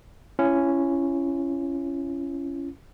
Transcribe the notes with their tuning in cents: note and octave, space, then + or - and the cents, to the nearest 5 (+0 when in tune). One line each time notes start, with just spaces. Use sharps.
C#4 +0 E4 +40